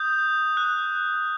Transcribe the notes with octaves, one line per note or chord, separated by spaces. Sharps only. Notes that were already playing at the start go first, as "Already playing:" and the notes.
Already playing: D#6 G6
F#6